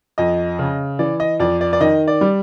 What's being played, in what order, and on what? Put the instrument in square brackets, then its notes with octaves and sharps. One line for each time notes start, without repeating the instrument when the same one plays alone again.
[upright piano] F2 D#5
C#3
E3 D5
D#5
F2 D5
D5
D5
D#3 D#5
D5
G3